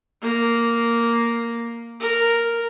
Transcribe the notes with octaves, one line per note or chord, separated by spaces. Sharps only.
A#3
A#4